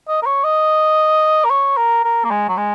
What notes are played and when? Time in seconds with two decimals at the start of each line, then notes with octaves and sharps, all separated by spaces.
0.08 D#5
0.22 A#4
0.26 C#5
0.44 D#5
1.45 A#4
1.50 C#5
1.77 A#4
2.05 A#4
2.25 A#3
2.31 G#3
2.49 F#3
2.57 G#3